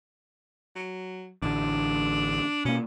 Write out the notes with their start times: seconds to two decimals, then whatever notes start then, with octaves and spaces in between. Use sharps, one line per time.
0.76 F#3
1.42 A1 D3 D4
2.65 B2 A#3 C#4